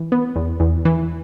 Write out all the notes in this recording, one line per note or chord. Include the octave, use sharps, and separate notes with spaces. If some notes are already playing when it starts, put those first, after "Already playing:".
Already playing: E3
B3
E2
E2
E3